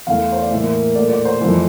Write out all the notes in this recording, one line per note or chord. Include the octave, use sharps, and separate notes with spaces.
E2 E3 A3 F5
C5
D5
A2 E3 A#3 E5
A#2 A3 D5
D5
C5
F2 E3 A3